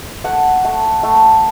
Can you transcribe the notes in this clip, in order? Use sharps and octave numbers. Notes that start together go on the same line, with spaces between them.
A3 F#5
A3
A3